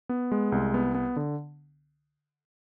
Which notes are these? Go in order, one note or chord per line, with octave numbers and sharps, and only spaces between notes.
B3
G#3
C2
B3
B3
D3